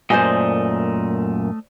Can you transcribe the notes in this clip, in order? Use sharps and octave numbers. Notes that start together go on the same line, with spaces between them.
F#2 A#2 A3 C5 D5 D#5 G#5